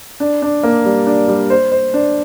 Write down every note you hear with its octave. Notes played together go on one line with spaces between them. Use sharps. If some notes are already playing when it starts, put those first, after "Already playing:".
D4
D4
A#3
G3
D4
G3
C5
C5
D4